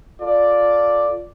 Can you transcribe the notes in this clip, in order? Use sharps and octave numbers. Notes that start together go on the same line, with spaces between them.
F4 A4 D5